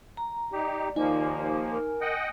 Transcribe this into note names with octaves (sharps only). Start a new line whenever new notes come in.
A#5
D#4 G4 D5
D#2 F3 A#3 D#4 G#5
A#4
D#5 F#5 G5